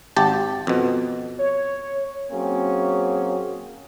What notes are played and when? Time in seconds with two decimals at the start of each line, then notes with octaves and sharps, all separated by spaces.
0.16 G#1 G4 A5
0.67 F2 B2
1.39 C#5
2.31 F#3 A#3 C4 C#4 G#4